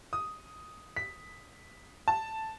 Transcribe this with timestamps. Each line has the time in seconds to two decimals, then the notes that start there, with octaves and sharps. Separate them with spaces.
0.13 D#6
0.97 B6
2.08 A5